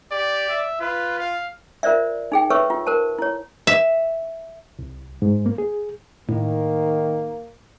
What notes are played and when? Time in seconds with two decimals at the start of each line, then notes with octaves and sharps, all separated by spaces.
0.12 G4 D5
0.49 E5
0.81 F4 B4
1.19 F5
1.83 F4 A#4 C5 D5 E5
2.32 D#4 G#4 G5
2.50 A4 B4 C#5 E5 C#6 E6
2.70 F4
2.87 A#4 C5 A5
3.19 E4 C#5
3.67 E5
4.79 C2
5.22 G#2
5.46 A#3
5.58 G#4
6.29 A2 D#3 A#3